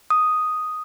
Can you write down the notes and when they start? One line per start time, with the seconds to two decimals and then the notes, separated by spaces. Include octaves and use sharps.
0.10 D#6